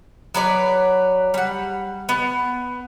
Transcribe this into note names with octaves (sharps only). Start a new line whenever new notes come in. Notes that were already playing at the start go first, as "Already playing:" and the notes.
F#3 B4 C#5 D5
G3 F#5
B3